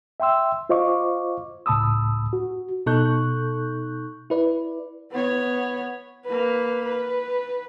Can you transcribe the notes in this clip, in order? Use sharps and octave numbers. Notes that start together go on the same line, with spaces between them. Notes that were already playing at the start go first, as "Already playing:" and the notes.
E5 G5 C6 E6
F4 C5 D#5 F5 C#6 D6
C#2 A2 A5 B5 D#6 E6
F#4
B2 D#4 A4 C#6 F#6 G6
E4 B4 D5
B3 C#5
A#3 B4
B4